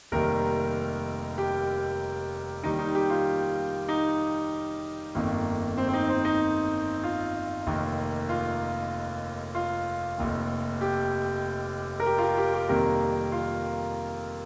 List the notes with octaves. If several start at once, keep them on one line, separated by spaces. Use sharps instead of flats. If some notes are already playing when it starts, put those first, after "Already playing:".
F1 D#2 D#3 G3 A#4
G4
D#2 D#3 G3 D#4
D#4
G4
F4
D#4
G1 F2 D#3 A#3
C4
C4
D#4
C4
D#4
F4
F1 D#2 D#3 A#3
F4
F4
F1 D#2 D#3
G4
A#4
G4
F4
G4
G4
G4
F2 C3 D#3 G3 A#3 A#4
F4